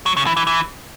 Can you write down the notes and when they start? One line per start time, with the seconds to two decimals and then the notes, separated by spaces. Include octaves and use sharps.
0.06 F#3
0.17 C#3
0.26 E3
0.37 E3
0.47 E3